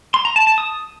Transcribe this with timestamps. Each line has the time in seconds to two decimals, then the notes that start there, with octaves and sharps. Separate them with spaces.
0.14 C6
0.25 A#5
0.36 A5
0.47 A5
0.58 D#6